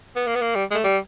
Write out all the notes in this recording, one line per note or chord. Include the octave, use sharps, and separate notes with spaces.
B3
A#3
B3
A#3
G3
G#3
A3
G3